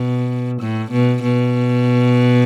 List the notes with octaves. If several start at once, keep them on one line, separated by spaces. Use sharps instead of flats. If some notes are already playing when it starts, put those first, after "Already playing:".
Already playing: B2
A2
B2
B2